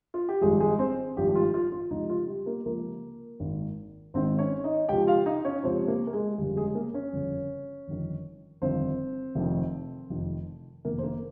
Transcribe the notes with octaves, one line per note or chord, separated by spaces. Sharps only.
F4
G4
G#1 G2 F3 G#3 G#4
G#3 G#4
C4 C5
G#1 G2 F3 G3 G4
G4
F4
F4
F4
C#2 C3 F3 D#4
F4
G3 G4
A#3 A#4
C#2 C3 F3 A#3 A#4
G#1 G#2 D#3
G#1 G#2 D#3 C4 C5
C#4 C#5
D#4 D#5
C#2 C3 F3 G4 G5
F4 F5
D#4 D#5
C#4 C#5
C#2 C3 F3 C4 C5
A#3 A#4
A#4
G#3 G#4
G1 F2 C#3 G3 G4
G#3 G#4
G#4
A#3 A#4
C#4 C#5
G1 F2 C#3
G1 F2 D#3
G1 F2 D#3 C4 C5
F1 F2 D#3
F1 F2 D#3
F1 F2 D#3 A#3 A#4
C5
A#3 A#4